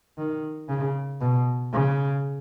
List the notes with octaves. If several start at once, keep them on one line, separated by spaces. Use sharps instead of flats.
D#3
C#3
B2
C#3